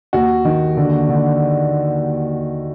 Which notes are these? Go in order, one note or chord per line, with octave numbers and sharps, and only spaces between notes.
D#2 F#4
D#3
D3
D3